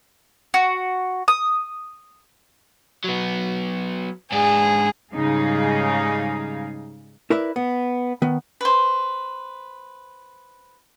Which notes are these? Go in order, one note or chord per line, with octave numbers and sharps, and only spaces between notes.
F#4
D#6
F#3 B3
G#2 D4 G#4
G#2 C#3 G3 D#4 G#4 F5
E4 A#4 B4 D5 E5
B3
D#3 B3
B4 C5